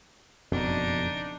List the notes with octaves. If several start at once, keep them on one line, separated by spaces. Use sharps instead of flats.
F#1 F2 B2 D4 D#4